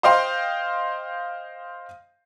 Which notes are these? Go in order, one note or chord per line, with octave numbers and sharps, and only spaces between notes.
C5 D#5 F5 G5 C6